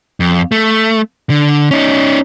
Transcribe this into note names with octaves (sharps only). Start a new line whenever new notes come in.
F2
A3
D3
C#4 D#4